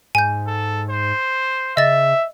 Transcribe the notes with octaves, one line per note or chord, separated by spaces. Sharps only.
G#2 G#5 G6
A4
C5
C#3 D#5 E5 A6